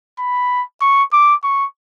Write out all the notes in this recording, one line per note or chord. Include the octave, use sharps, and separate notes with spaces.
B5
C#6
D6
C#6